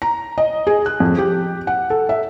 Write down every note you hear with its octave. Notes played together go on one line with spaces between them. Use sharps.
A#5
D#5
G#4
F#6
F2
G4
F#5
A4
E5